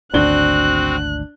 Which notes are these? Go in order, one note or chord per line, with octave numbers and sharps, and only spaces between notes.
G#1 D2 C4 D4 F#4 F#6 G7